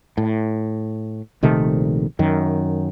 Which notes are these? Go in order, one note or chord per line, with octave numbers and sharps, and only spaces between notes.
A2
A#1 C3 D#3 A3
F#2 D#3